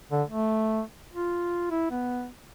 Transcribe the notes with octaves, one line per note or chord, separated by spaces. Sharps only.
D3
A3
F4
E4
B3